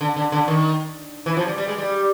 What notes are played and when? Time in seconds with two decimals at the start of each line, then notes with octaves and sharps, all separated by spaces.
0.01 D3
0.16 D3
0.32 D3
0.48 D#3
1.26 E3
1.37 F3
1.46 G3
1.58 G3
1.68 G#3
1.78 G3